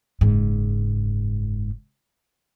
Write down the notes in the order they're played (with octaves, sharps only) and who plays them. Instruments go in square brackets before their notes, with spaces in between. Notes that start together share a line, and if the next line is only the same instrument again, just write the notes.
[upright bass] F#1 G#2